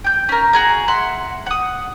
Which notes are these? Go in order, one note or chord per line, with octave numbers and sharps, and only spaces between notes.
G5 G6
C#4 A#4
F#4 G#4 A#5
E5 F#5 C6
F#5 D#6